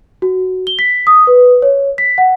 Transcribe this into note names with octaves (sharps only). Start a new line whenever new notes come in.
F#4
G7
B6
D#6
B4
C#5
B6
F#5